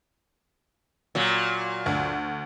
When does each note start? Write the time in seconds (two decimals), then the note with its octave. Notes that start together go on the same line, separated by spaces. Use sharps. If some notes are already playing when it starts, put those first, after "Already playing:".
1.15 A#2 F#3
1.86 D2